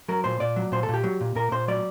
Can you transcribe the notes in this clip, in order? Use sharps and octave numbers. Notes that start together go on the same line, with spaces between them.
F#3 A#4
A#2 C5
A#2 D5
F#3
A#2 C5
A4
A#2
G4
F#3
A#2
A#2 A#4
A#2 C5
F#3 D5